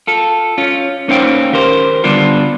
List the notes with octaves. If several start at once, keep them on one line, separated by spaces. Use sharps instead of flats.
F4 A4
C#4 F4
A#3 C#4 D#4 C5 F5 G5
D#3 G4 A#4 C5
D3 G3 B3 D4 F4 G4